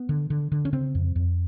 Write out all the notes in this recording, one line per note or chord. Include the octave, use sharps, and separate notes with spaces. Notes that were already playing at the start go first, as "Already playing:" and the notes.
Already playing: B3
D3
D3
D3
C#4
C#3 C4
F2
F2